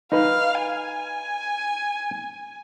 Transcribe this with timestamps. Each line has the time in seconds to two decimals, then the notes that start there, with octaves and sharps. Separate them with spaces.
0.12 D#4 B4 F5
0.62 G#5